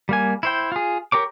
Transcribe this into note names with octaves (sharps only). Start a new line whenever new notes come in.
G3 A#3 G#5
E4 C5 G5
F4 G#4
G4 A#4 C#5 D6